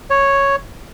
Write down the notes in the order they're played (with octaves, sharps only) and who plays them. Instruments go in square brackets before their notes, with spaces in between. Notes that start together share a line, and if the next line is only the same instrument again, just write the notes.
[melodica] C#5